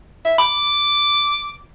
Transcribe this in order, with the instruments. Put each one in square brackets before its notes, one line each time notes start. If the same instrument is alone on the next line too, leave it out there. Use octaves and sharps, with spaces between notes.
[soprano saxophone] E5
[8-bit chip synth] B5 [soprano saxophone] D6